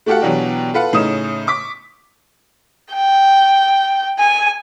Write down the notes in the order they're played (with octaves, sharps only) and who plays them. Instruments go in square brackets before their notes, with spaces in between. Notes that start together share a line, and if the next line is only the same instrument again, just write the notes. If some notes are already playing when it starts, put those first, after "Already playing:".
[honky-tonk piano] A3 F#4 G4 A4 F5 F#5
B2 E3 F#3 D4 F#4 G4
F4 A4 B4 F5 F#5
A2 C#3 C#4 D#4 D#6 E7
C#6 D6 B6
[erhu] G5
G#5